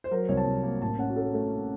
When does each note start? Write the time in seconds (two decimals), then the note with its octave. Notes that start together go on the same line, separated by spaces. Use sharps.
0.04 C5
0.11 F#3 A#4
0.20 C5
0.29 C2 C#5
0.37 A5
0.46 C2
0.63 A#3
0.82 A1 A5
0.98 C#4 F#5
1.10 F#4
1.16 C#4 A4
1.34 A3